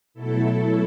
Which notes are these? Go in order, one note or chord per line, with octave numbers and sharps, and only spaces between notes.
B2 F#3 A3 E4 A4